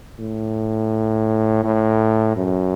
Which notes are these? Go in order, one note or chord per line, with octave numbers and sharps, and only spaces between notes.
A2
A2
F#2